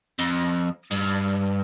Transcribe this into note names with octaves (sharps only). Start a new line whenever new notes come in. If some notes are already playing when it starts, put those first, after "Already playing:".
F2
G2